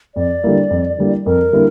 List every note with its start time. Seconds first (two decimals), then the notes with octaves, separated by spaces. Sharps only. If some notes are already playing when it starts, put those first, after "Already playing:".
0.15 F2 D5
0.44 D3 G3 A#3 E4
0.70 F2
0.98 D3 G3 A#3 E4
1.26 F2 A#4
1.53 D3 G3 A#3 E4